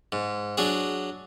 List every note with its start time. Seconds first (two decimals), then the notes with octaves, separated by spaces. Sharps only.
0.12 G#2
0.57 F#3 D4 G#4